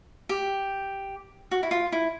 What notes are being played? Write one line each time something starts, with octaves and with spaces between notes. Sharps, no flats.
G4
F#4
E4
F4
E4